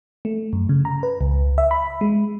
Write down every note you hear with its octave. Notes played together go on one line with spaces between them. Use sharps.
A3
F#2
C#3
A#5
B4
C#2
E5
B5
G#3